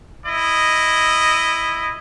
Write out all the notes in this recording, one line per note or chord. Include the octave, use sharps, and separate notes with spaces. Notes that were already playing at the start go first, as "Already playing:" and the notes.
E4 D#5